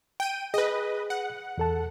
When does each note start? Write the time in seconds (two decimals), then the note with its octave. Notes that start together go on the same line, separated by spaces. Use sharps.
0.20 G5 D#7
0.54 G#4 B4 D#5
1.10 F#5
1.58 E2 A4 A5